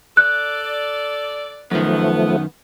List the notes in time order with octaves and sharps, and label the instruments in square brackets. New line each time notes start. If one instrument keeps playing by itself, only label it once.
[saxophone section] A4 D5 [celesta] F#6
[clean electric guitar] F#2 D#3 [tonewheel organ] F3 A3 [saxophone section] B3